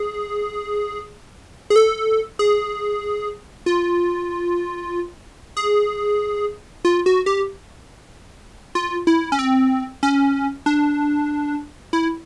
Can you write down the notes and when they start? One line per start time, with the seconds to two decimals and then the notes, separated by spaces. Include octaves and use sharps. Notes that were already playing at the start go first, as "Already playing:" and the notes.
Already playing: G#4
1.70 G#4
1.76 A4
2.39 G#4
3.66 F4
5.57 G#4
6.85 F4
7.06 F#4
7.26 G4
8.75 F4
9.07 E4
9.32 C#4
9.39 C4
10.03 C#4
10.66 D4
11.93 E4